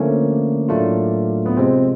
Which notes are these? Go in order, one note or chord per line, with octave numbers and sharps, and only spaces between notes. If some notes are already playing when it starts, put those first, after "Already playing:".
Already playing: D3 F3 A3 A#3 C#4
A2 F#3 A3 D4 F4
B3
C3 F3 G#3 C4